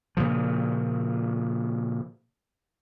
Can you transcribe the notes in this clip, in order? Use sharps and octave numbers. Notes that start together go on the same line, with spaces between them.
A#2 C#3 F3